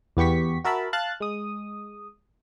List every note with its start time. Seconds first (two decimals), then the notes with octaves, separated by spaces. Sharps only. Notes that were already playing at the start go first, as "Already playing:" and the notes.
0.17 E2 B3 G4 C#6 B6
0.64 F#4 A#4 E5 A5 B5
0.93 F5 A5 F#6 A6
1.20 G#3 D#6